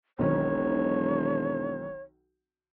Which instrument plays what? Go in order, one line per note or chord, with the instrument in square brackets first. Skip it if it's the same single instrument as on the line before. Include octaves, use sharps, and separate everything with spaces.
[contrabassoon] E1 [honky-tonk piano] B1 D#3 C4 [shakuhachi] C#5